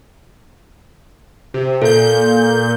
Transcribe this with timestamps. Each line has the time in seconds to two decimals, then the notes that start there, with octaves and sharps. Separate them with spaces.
1.54 C3
1.82 A#2 A4 G6